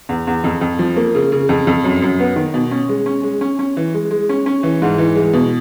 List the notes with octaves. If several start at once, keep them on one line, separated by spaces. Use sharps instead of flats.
E2
E2
F2
F2
F3
A#3
C#3
C#3
F2
F2
F#2
F#2
B3
D#3
B2
C#4
G#3
C#4
G#3
C#4
C#4
E3
G#3
G#3
C#4
C#4
E3
G#2
E3
G#3
B2